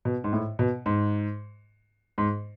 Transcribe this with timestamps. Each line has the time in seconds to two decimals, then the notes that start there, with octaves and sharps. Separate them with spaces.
0.05 B2
0.24 G#2
0.33 A2
0.59 B2
0.86 G#2
2.18 G#2